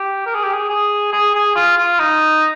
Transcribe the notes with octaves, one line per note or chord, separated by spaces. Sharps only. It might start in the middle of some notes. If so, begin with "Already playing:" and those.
Already playing: G4
A#4
G#4
G4
G#4
G#4
G#4
G#4
F4
F4
D#4